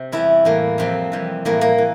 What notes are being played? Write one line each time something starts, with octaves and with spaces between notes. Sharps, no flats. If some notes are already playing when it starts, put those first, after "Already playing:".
Already playing: C3
E2 E3 G3 E4
A2 E3 G3 A#3
F2 C3 E3 G3 C4
F2 E3 G3
A2 E3 G3 A#3
A#3
E3